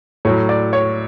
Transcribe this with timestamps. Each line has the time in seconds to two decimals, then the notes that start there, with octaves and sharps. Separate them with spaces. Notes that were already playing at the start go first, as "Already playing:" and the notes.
0.25 A2 F#3 C#5
0.49 D5
0.73 C#5